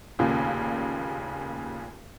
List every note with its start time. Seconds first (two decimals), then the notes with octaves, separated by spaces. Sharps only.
0.19 F1 D#2 A#2 C#3